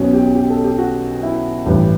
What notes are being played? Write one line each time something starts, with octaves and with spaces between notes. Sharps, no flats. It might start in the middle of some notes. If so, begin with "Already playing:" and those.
Already playing: B1 B2 C#4
G4
G4
A4
G4
F#4
E4
A1 G2 E3